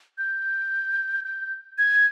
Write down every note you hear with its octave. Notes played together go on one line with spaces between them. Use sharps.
G6
G6
G#6